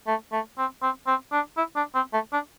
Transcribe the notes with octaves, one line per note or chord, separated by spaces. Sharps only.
A3
A3
C4
C4
C4
D4
E4
D4
C4
A3
D4